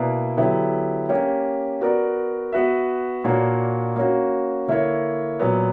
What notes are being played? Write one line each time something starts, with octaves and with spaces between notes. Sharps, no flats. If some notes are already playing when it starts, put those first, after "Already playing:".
Already playing: B2 A#3 E4 B4 D5
D3 F#3 B3 E4 G4
A#3 C#4 G4
B3 F#4 A#4 D5
B3 F#4 B4 E5
A#2 A#3 D4 F#4 C#5
A#3 C#4 F#4
D3 A#3 E4 A#4 C#5
A#2 F#3 B3